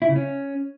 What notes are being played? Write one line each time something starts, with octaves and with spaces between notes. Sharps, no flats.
E4
C#3
C#4